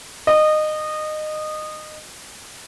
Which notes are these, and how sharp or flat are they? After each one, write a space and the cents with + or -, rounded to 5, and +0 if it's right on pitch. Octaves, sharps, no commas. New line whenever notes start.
D#5 -20